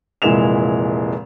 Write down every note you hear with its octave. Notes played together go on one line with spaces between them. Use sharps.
F1 A#2 E3 G#3 E7 F7